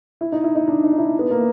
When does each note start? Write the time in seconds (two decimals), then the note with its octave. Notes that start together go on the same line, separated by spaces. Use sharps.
0.21 E4
0.32 D#4
0.44 E4
0.55 D#4
0.68 D4
0.83 D#4
0.93 D#4
0.98 E4
1.19 B3
1.31 A#3